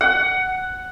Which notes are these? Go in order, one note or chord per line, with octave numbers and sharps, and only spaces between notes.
F#5